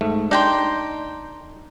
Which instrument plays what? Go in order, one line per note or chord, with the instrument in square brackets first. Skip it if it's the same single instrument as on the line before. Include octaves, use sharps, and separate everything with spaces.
[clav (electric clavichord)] G#2 A3
[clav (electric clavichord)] D4 [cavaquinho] D#4 G5 C6